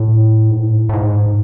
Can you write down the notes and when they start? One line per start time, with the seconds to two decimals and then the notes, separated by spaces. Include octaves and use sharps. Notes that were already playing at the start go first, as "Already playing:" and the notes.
Already playing: A2
0.50 G#2
0.58 A2
0.89 A2
0.93 G#2